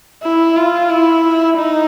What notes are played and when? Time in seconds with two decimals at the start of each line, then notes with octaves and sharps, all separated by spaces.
0.23 E4
0.57 F4
0.90 E4
1.57 D#4